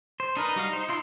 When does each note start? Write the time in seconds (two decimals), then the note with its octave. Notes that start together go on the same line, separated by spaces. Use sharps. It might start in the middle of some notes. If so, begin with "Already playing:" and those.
0.20 C5
0.37 D4 D#4 A#4 B4
0.56 G3 F#4 F5
0.73 C5
0.88 E4 F4 C6